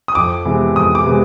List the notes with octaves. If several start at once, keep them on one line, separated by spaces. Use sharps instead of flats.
D#6
F2 D6
C3 E3 G#3 B3
F2 D#6
D6
C3 E3 G#3 B3